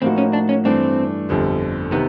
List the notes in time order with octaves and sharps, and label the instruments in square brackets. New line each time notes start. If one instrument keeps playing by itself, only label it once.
[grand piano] A2 F3 A#3 D#4 F#4 [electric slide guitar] C4
[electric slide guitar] C#4
D4
C#4
[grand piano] G2 E3 A3 D4 [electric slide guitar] C4
[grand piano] G1 F2 D3 G3
[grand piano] C3 D#3 [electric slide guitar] B3